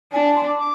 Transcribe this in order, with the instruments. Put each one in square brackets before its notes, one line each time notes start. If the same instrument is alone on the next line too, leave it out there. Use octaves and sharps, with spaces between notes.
[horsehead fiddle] D4 [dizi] G#5
[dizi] G#5
C6
D6
D6